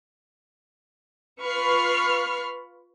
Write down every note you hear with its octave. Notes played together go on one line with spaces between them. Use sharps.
F4 B4 B5 C#6 F6 C7